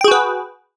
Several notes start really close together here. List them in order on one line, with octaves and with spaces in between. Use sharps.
G5 G#4 F#4 B4